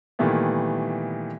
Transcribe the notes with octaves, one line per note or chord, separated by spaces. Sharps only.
A#2 D#3 E3 G3 A3 B3